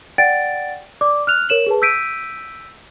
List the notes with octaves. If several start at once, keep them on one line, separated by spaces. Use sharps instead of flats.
D5 F#5 G5 A6 D7
D5 D6
F6 F#6 F7
A#4 C#5 E7 F#7
G#4 B4 A5
E6 G6 B6 D7 D#7